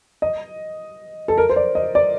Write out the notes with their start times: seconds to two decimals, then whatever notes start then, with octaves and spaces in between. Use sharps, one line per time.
0.22 D#5
1.28 A4
1.38 A#4
1.49 C5
1.56 D5
1.75 D#5
1.95 D5